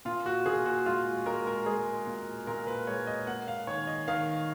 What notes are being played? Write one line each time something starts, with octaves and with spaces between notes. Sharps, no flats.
A#2 F4
F#4
A#2 G#4
F#4
G#3 F4
G#3 A#4
A#4
G#3 G#4
A#2
A#2 A#4
B4
G#3 C#5
D#5
A#3 F#5
F5
D#3 C#5
D#5
D#3 F5